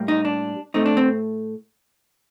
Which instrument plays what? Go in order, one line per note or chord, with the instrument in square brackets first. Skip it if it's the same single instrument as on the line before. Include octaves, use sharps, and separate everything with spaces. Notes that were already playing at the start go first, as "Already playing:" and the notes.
Already playing: [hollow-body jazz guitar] A2 G3 A#3
D#4
D4
A2 A3 C4 D#4
D4
C4